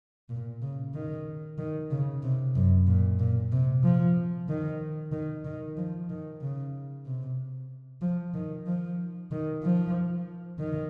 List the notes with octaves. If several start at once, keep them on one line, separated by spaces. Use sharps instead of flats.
A#2
C#3
D#3
D#3
C#3
C3
F#2
A#2
A#2
C3
F3
D#3
D#3
D#3
F3
D#3
C#3
C3
F3
D#3
F3
D#3
F3
D#3